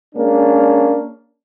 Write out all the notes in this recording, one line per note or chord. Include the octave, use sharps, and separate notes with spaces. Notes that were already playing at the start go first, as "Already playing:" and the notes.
G#3 A#3 C#4 D4